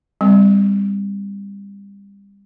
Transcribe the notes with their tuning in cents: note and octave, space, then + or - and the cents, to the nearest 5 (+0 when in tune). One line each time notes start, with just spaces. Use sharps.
G3 +30 C4 -10